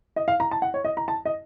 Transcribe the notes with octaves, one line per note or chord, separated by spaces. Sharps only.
D#5
F5
A#5
A5
F#5
C#5
D#5
A#5
A5
D#5